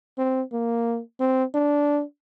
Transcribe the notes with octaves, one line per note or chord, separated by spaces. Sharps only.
C4
A#3
C4
D4